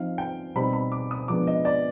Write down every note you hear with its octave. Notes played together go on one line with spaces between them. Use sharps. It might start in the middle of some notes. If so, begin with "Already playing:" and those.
Already playing: F3 C4 D#4 F5
G5
B2 G3 C4 D#4 B5
B5
D6
D#6
F3 G#3 B3 D4 D6
D#5
D5